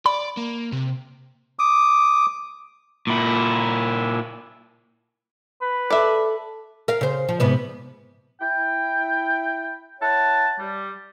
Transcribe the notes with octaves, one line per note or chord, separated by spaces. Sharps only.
D5 B5
A#3
C3
D6 D#6
A#2 E4
B4
A4 D5 E5
A#4 F5
C#3 C5
F3
G#2 C3 B3
E4 G5
E4 C#5 F#5 A5
G3